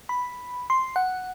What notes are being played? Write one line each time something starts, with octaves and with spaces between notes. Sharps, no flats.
B5
C6
F#5